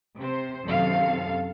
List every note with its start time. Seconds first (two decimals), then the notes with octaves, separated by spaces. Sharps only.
0.17 C3 C5
0.65 F#2 C3 D#3 A4 F5